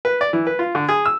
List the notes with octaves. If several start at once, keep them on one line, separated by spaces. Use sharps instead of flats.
B4
D5
E3
B4
F4
D3
G#4
E6